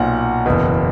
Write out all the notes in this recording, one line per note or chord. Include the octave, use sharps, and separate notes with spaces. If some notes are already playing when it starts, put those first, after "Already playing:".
Already playing: B1 A#2 F#5
F#1 E2 B2